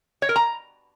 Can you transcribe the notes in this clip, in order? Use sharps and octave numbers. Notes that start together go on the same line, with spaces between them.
C#5
A#4
A#5